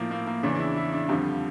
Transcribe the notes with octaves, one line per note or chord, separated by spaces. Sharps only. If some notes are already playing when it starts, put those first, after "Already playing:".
Already playing: A2 F3 A#3
A#3
A#3
E2 C#3 E3 D4
D4
E4
E4
D4
F2 D3 F3 G3